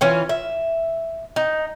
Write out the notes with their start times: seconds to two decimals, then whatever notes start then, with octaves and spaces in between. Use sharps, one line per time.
0.01 E3 C#4 F4
0.29 E5
1.36 D#4